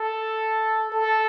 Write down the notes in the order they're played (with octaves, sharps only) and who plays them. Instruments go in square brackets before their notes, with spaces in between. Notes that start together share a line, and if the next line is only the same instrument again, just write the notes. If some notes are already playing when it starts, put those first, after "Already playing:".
Already playing: [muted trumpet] A4
A4